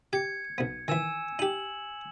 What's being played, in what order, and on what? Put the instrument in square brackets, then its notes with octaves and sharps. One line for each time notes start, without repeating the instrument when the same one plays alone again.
[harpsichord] G4 [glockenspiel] G#6 C#7
[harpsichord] B1 B3
[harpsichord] D#3 E3 [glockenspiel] G#5 E6 E7
[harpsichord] D#4 G4 [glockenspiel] F#7